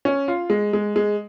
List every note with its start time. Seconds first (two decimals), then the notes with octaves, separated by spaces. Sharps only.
0.05 C#4
0.28 F4
0.50 G#3
0.73 G#3
0.96 G#3